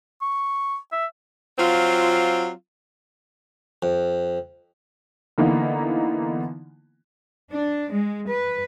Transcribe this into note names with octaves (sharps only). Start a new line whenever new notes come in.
C#6
E5
F#3 C4 F4
F2
D3 E3 A#3 B3 D#4
D4
G#3
B4